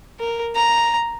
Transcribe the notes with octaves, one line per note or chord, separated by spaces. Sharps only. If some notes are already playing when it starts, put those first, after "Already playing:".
A#4
A#5